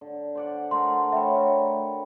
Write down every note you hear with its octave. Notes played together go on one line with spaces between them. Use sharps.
D3
C5 D5 F#5
A3 F#4 A#4 C6
A3 C#5 E5 G5 B5
D3 A#4